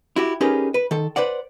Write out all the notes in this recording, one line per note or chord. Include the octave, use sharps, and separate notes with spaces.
E4 F#4 G4
C#4 D#4 G4 G#4 A#4 B4
B4
D#3 A4
B4 C5 D5 F#5